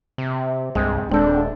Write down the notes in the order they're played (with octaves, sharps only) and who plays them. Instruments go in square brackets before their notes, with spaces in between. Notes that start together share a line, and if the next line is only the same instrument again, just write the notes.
[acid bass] C3
[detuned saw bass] C2 [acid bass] G2 [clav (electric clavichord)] G#3 C4
[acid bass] D#1 [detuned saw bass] G#3 [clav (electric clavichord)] C4 A4 G5 [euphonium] D4